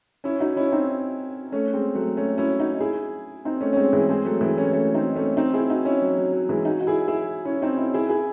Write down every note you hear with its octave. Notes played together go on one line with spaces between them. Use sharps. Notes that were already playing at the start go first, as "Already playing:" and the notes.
C#4 E4
D#4 F#4
C#4 E4
C4 D#4
A3 C#4
G#3 C4
F#3 A3
A3 C#4
C#4 E4
D#4 F#4
E4 G#4
C4 D#4
A3 C#4
C#4
G#3 C4
E3 G#3
G#3 C4
F#3 A3
E3 G#3
A3 C#4
A3 C#4
C4 D#4
A3 C#4
C4 D#4
E4 G#4
D#4 F#4
C#4 E4
F#3
F#3
F#3
E3 G#3
D#4 F#4
F#4
E4 G#4
E4 G#4
C#4 E4
C4 D#4
C#4 E4
E4 G#4
E4 G#4